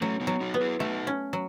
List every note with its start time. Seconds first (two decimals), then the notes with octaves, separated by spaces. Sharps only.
0.01 F#3 A3 C#4
0.21 B3 D#4
0.27 F#3
0.41 D#4 F#4
0.54 B3
0.61 E4 G#4
0.80 A3 D#4 F#4
1.07 C#4
1.33 F#3